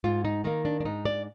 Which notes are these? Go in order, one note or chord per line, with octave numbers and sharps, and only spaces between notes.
G#2 F4
D#4
D#3 A#3 D#4
D4
D4
G#2 D#4
D5